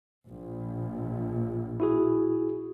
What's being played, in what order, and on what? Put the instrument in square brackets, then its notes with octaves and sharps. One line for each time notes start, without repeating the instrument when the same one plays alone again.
[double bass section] A#1
[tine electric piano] E4 F#4 G#4